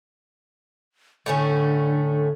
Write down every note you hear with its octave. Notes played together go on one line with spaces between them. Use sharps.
A2 D3 A3 C#4